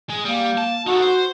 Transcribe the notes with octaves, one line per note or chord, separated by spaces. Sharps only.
G#3 G#4
G3 A#3
A5
D#4 F#4 A4
C5